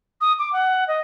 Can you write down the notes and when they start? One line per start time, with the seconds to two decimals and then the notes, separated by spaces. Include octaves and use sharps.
0.21 D#6
0.39 D6
0.53 F#5
0.88 D#5